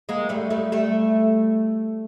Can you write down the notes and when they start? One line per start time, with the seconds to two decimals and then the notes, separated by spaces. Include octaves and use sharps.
0.09 G#3 A#3
0.29 G3 A3
0.50 G3 A3
0.72 G3 A3